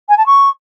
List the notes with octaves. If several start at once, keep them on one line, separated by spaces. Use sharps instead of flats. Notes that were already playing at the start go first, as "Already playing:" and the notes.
G#5
A5
C#6